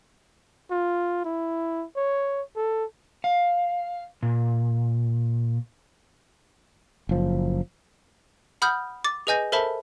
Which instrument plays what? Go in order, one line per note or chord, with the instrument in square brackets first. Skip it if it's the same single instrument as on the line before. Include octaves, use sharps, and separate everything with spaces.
[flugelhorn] F4
E4
C#5
A4
[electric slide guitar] F5
A#2
[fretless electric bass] F#1 F3
[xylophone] F#5 B5 D#6 F6 G6
D6 A6
G#4 B4 D#5 G#5 G6 A#6
A4 A#4 C5 E5 A5 B5